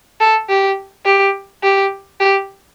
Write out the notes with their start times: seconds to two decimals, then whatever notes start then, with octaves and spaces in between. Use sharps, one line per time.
0.21 A4
0.49 G4
1.06 G4
1.63 G4
2.20 G4